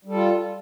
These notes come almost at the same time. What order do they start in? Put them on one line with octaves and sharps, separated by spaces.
G3 A4 F4